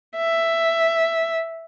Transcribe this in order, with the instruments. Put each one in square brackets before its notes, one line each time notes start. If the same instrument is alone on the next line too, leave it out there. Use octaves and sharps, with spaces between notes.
[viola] E5